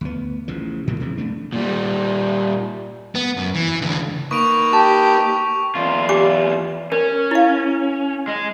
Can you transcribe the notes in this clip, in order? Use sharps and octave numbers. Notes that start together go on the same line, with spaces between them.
D2 B3
A1 C#3 F3
G#2 B2 E3 A#3
B1 C3 E3 G#3
F2 A3 D4
A#2 G3
B3
F#2
E3
C#2 D3
A#3 D#4 B4 C#6 D7 F7
G4 A5
E2 F4
G4 G#5 D6
C#4 A#4
E4 F5
G#3